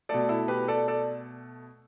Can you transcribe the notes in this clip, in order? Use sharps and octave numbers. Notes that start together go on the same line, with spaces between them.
B2 A3 A4 D5
E4 A4
G4 B4
A4 D5
A4 D5